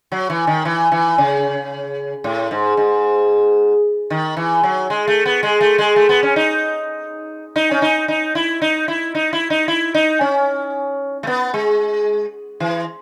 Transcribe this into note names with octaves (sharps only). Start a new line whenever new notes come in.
F#3
E3
D#3
E3
E3
C#3
A2
G#2
G#2
D#3
E3
F#3
G#3
A3
B3
G#3
A3
G#3
A3
B3
C#4
D#4
D#4
C#4
D#4
D#4
E4
D#4
E4
D#4
E4
D#4
E4
D#4
C#4
A3
B3
G#3
E3